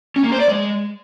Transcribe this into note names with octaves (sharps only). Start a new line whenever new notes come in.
C#4
A#3
C5
D5
G#3